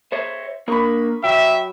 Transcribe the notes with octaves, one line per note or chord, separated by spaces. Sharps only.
C5 C#5 E5
A#3 D4 A#4 B5 C#6 D#6
F#3 E5 G5